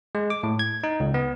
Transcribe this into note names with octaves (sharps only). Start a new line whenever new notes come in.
G#3
D6
A2
G#6
D#4
C#2
B3